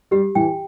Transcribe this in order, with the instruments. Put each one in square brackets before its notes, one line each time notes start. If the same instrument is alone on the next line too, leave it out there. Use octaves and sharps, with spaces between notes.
[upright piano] G3 [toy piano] G4
[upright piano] E3 [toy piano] G5